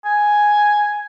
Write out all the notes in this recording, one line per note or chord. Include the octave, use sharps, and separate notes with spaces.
G#5